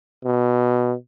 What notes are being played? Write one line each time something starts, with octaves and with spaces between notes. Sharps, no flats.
B2